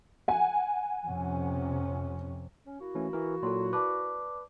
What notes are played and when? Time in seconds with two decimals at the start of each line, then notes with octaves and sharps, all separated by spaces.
0.28 F#5 G#5
1.06 F2 C3 C#4
2.67 C#4
2.80 A#3 E4 F#4
2.95 E3 A3 C#4
3.13 E3 A#4
3.43 A#2 F#3 A4 C6
3.73 B4 D5 A5 D6